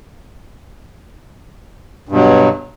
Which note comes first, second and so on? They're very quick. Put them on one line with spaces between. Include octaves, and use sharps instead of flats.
G2 B2 F#3